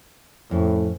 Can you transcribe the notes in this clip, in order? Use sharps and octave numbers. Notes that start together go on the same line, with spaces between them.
F2 A2 C#4